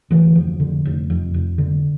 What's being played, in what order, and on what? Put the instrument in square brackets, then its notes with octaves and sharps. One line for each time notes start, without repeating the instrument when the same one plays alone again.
[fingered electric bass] D2 E3
F1 F3
D3
F1
F2
F1
D3